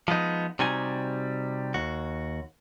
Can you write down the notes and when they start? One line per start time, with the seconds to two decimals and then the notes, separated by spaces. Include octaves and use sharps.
0.08 F3 G#3 B3 D#4
0.59 C3 G3 D#4 F#4 G#5
1.74 D#2 F#4